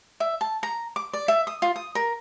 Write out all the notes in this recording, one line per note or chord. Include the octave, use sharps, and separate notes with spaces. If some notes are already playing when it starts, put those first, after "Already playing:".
E5
A5
A#5
D6
D5
E5
D#6
F4
D#6
A#4